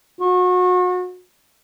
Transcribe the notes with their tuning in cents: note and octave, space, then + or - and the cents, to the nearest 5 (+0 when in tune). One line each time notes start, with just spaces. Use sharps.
F#4 -35